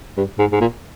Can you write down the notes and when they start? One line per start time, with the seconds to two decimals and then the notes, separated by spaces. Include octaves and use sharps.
0.17 G2
0.38 G#2
0.52 G#2
0.60 A#2